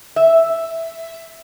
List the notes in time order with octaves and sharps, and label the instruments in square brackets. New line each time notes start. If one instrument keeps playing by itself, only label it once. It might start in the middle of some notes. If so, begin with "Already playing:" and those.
[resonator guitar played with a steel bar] E5